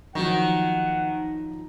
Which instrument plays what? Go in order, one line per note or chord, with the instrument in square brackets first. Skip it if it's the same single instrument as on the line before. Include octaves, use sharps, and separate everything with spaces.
[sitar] D#3 [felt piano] F3 F#3 [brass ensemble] A#3 D#4 F#5